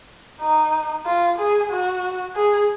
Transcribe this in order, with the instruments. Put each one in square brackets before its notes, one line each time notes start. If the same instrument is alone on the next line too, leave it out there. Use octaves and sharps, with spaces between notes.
[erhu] D#4
F4
G#4
F#4
G#4